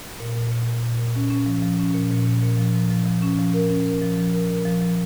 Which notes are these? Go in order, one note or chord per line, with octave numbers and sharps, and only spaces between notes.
A#2
A#2
A#2
A#2
A#2
A#2
C#4
C#4
F3
F3
C#4
A#2
A#2
A#2
A#2
F3
F3
F3
F3
C#4
F3
A#4
C#4
A#4
F3
F3
A#4
A#4
F3
F3